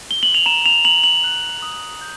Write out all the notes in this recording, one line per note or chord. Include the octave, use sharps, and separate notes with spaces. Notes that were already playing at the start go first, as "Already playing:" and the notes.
G7
F#7
F7
A#5 E7
F7
A#5 F#7
F#7
F#6
D#6
G6